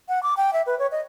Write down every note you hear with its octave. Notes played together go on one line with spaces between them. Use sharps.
F#5
D6
G5
E5
B4
C#5
D#5